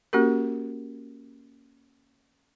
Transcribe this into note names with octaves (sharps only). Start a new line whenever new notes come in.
A#3 C#4 F#4 G4 A#4